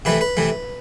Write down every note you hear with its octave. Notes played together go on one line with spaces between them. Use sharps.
C3 E3 A3 B4
B4
C3 E3 A3